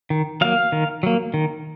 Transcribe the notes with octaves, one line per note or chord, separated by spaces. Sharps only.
D#3
F#3 A#3 F5
D#3
F#3 A#3
D#3